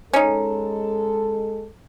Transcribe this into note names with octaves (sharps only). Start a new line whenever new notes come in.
G#3 C#4 D#4 A4